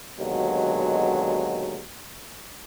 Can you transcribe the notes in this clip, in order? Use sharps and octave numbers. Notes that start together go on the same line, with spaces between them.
D#2 B2 D3 F#3 G#3